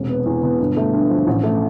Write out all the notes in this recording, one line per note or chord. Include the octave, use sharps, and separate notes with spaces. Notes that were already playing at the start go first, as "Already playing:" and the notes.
Already playing: E1 C3
B3
E2
B2
G1
A3
G2
F3
A1
A3